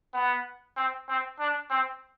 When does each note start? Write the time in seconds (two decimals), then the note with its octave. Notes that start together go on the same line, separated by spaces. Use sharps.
0.13 B3
0.76 C4
1.08 C4
1.39 D4
1.70 C4